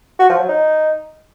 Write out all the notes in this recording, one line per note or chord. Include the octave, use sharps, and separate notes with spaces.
F#4
F3
F#3
D#4